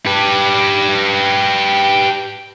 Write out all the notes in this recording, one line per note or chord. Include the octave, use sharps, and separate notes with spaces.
G4 B4